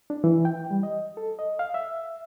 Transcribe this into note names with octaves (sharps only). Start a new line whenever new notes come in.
D4
E3
G5
G3
D#5
A4
D#5
F5
E5